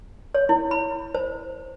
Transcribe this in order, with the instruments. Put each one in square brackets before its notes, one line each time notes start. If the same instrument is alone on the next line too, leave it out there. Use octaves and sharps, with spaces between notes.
[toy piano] C#5
E4
B5
C5